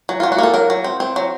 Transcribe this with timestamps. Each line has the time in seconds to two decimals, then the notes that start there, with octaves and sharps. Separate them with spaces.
0.09 F#3
0.20 F#3 F4
0.32 F#4
0.38 A#3 A4
0.54 F#3 A#4
0.70 F#3
0.84 C4
1.00 C4
1.16 F#3